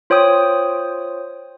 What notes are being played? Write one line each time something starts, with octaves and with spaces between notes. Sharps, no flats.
F4 C5 C#5 G5 D#6